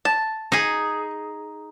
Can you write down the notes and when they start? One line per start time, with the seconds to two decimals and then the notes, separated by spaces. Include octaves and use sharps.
0.05 A5
0.52 D#4 G#4